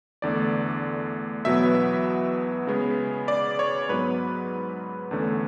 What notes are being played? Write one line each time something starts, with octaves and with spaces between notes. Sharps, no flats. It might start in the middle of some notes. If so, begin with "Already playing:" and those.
E2 D3 A3 D5
E2 B2 F#3 B3 E5
E5
C#3 G#3 B3
D5
C#5
G#2 F#3 B3 B4
E2 D3 A3 C#4